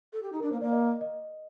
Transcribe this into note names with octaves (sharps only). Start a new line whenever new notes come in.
A4
G4
D#4
D4 A#4
A#3 C5
A#3 D5
D#5
D#5